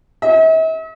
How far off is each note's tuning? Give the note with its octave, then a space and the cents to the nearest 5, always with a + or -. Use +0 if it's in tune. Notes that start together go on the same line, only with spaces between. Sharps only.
E5 -45